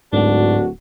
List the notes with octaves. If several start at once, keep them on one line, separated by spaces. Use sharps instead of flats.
D1 G#2 D4 F#4